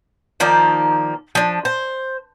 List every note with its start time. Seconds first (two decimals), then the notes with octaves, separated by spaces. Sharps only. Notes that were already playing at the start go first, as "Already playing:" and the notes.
0.40 D#3 F3 A#3 D5
1.35 F3 D4
1.65 C5